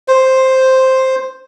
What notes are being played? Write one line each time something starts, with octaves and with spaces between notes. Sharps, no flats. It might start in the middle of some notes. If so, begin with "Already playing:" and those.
C5